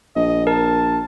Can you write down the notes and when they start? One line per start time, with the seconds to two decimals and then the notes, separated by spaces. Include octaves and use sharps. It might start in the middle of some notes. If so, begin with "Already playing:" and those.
0.16 A#1 D#5
0.47 A#4 A5